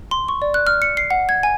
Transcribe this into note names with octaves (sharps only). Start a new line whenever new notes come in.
C6
C#6
D5
F#6
F6
C#7
C7
F#5
G#6
G#5